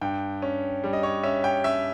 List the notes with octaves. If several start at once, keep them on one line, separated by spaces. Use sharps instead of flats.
G2 G5
C#4
G3
D#5
C#5
C#4 E5
G5
C#4 E5